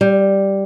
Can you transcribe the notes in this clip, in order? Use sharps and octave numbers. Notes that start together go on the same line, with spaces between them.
G3